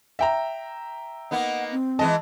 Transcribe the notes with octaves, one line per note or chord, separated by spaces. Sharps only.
E5 G5 A#5
A#3 B3 D#4 F#5
C4
E3 G#3 D#5 A5